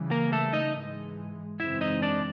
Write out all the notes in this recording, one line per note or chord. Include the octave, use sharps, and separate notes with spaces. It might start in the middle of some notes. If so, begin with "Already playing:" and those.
Already playing: C#3 E3 G3
A#3 A#4
A3 A4
D#4 D#5
G#2 E3 G#3
F#2 C#3 E3 G#3 C4 E4 E5
D#4 D#5
D4 D5